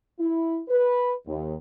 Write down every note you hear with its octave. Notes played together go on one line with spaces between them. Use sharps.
E4
B4
D#2